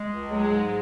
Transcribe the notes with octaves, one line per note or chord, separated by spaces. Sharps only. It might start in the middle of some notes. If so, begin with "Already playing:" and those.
Already playing: G#3
C#2
F#3 G#3
G#2